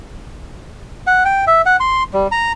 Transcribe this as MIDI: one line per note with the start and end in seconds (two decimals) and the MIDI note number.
1.07 1.23 78
1.25 1.45 79
1.47 1.62 76
1.66 1.76 78
1.80 2.03 84
2.14 2.27 55
2.32 2.52 82